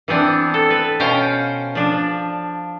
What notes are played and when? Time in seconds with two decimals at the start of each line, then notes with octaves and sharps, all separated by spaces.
0.08 E3 B3 C4 D4
0.54 A4
0.70 B4
1.00 B2 C#4 C5 F5 G5
1.75 F3 D4